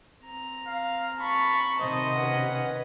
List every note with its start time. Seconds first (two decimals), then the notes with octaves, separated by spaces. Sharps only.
0.22 C4 A#5
0.66 F5
1.21 A5 B5 C#6
1.80 C3 D#3 C5 D#5
2.14 C#4 B4 F#5